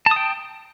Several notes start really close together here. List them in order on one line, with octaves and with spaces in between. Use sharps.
A5 D#6 G5